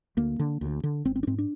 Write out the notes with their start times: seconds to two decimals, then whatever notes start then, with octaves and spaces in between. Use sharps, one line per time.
0.17 D2 A#3
0.39 D3
0.61 D2
0.83 D3
1.05 G#1 C4
1.16 C4
1.23 D4
1.27 G#2 C4
1.38 D4